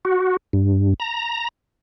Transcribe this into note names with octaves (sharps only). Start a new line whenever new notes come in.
F#4
G2
A#5